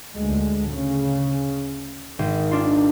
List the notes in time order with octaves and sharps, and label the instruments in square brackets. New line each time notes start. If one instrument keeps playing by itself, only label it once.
[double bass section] D2 G#3
C#3
[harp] G#1 [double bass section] D#3
[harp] D4 F4